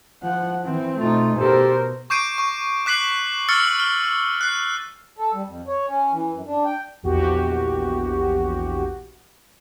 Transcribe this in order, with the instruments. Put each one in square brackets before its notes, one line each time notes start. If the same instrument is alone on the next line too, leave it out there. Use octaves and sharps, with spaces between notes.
[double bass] F3 [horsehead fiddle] F#5
[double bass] E3 [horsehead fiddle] C4
[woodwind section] B2 F4 [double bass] A3 D#4
[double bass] B2 [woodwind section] G4 A4 [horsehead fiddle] A#4 C5
[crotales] C#6 D6 G6 C7 D7 D#7
C#6
D6 F#6 B6 C7 F#7
C#6 E6 F6 A6 C#7 F#7
F6
F#6 C7
[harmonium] A4
G3
F2
C#5
C#4
E3
F#2
D4
G5
[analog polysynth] A#1 E2 F#4 G4